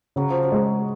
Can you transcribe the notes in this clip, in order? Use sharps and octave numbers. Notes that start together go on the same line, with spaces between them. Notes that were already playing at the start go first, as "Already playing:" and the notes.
C#3 F#3
F3
F#3
G#3